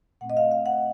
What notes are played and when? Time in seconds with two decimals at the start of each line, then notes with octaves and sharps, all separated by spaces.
0.21 A#2 A3 C4 F#5
0.30 D#5
0.37 F5
0.52 F5
0.66 F#5